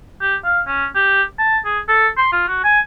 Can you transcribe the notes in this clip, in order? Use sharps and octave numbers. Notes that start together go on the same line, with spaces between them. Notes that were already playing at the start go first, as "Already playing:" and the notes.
G4
F5
C#4
G4
A5
G#4
A4
C6
F4
F#4
G#5